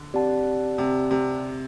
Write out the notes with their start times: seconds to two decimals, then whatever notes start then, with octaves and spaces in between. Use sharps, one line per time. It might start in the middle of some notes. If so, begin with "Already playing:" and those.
Already playing: D3
0.14 C4 G4 D5 F#5 A5
0.78 C3
1.11 C3